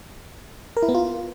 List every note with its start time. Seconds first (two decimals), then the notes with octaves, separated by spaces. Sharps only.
0.77 A#4
0.83 E4
0.89 B3
0.95 F4